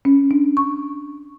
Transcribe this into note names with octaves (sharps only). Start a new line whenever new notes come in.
C#4
D4
C#6